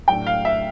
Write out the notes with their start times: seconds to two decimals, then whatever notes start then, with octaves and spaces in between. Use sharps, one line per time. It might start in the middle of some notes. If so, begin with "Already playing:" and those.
0.08 A2 F#3 A3 D4 G5
0.27 F5
0.45 E5